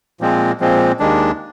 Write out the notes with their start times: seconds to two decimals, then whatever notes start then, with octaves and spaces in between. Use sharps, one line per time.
0.21 A#2 F3 G#3 C4
0.60 A#2 F3 G#3 C4
1.00 D#2 D#3 G#3 D4